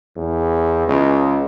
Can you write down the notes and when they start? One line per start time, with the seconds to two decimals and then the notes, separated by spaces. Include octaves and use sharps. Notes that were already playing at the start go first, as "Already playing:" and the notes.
0.16 E2
0.87 C#2